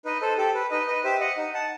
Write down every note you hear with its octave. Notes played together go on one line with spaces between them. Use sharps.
D#4 B4 D#5
A4 C5
G4 A4
B4
D#4 B4 D#5
B4 D#5
G4 C5 E5
D#5 F#5
D#4
F#5 A5